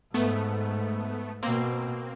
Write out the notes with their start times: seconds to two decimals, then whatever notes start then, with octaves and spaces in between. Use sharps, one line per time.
0.14 G#2 A3 B3
1.43 B2 A#3 C4